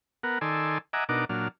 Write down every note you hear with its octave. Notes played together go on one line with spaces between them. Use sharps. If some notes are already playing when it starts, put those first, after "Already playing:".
B3 A#4 F#5
D#3 A4 D5 G#5 C6 E6
D#5 E5 F#5 G#5 A#5 D6
B2 D4 D#4 A#4 F#5 D6
A#2 F#3 D4 F6